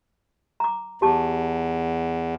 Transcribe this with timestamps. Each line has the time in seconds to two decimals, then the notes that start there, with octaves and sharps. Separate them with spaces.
0.60 A#5 D6
1.02 E2 G4 A5 D6